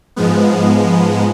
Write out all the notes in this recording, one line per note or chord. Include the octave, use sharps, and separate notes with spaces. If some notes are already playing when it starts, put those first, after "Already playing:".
G#2 F3 G#3 B3